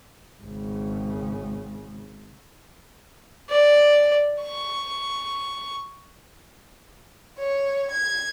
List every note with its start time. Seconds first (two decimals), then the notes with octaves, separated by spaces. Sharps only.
0.43 G#1 C#3
3.49 D5
4.42 C#6
7.37 C#5
7.92 G#6